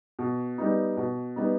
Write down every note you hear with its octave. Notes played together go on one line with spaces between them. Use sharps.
B2
G3 B3 D#4
B2
G3 B3 D#4